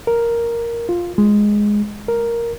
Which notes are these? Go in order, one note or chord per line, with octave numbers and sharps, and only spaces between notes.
A#4
F4
G#3
A#4